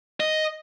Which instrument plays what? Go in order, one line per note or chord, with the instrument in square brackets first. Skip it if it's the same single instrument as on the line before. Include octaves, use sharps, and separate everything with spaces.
[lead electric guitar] D#5